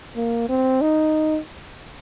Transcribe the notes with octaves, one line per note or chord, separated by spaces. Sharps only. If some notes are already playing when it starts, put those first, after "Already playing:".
A#3
C4
D#4